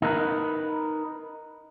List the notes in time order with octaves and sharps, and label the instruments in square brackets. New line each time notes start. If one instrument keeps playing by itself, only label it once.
[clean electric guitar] D#4 A#4 B4